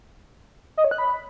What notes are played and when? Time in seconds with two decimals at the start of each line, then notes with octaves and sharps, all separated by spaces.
0.77 D#5
0.84 C#5
0.91 F#6
0.98 B5